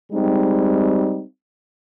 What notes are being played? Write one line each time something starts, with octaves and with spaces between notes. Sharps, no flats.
G3 G#3 C4 D#4